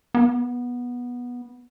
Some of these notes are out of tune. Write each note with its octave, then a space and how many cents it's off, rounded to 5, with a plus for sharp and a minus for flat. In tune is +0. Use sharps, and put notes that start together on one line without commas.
B3 -15